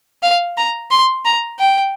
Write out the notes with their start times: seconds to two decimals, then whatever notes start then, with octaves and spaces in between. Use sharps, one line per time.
0.23 F5
0.58 A#5
0.91 C6
1.25 A#5
1.59 G5